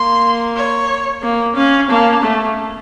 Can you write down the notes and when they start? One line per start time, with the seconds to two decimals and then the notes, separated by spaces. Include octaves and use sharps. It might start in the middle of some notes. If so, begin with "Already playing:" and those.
Already playing: A#3 C6
0.57 C#5
1.23 A#3
1.56 C#4 F5
1.90 A#3 A5
2.23 A3